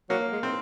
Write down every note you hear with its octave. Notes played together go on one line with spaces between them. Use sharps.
F#3 A#3
G#3
C4